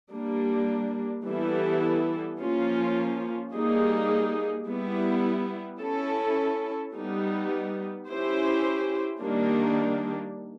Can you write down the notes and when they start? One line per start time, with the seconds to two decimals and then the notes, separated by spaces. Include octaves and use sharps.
0.13 G3 A#3 D4
1.26 E3 G3 B3 E4 A4
2.40 F3 A#3 C#4 F4
3.53 G3 A#3 D#4 G#4
4.68 G3 B3 E4
5.81 C#4 E4 A4
6.95 G3 B3 D#4
8.08 C#4 E4 G4 C5
9.22 D#3 G3 A#3 D4